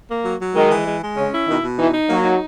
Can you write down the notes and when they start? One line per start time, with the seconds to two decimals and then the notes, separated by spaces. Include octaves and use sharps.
0.09 A#3
0.24 F#3
0.40 F#3
0.54 D#3 G#3
0.70 E3
0.86 G#3
1.01 G#3
1.16 C#3 C#4
1.32 E4
1.47 B2 D#3
1.62 B2
1.78 E3 D#4
1.93 D#4
2.08 F#3 A#3
2.24 D#4